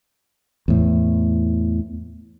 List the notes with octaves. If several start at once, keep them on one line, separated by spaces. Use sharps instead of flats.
E2 A2